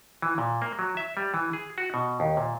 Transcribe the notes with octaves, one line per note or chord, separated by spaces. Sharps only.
E3
A#2
A#3
F#3
E5
G3
E3
G#4
F#4
B2
D#2
A#2